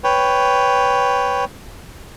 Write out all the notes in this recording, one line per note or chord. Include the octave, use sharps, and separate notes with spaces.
B4 C#5 G5